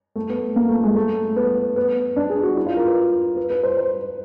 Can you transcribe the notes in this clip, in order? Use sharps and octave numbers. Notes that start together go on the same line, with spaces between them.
A3
B3
A#3
A3
G#3
A3
B3
B3
D4
G#4
F#4
E4
F4
A#4
B4
B4
B4
C5
C5